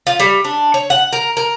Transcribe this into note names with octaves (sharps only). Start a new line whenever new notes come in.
F4
G3
D4
C#5
F#5
A#4
A#4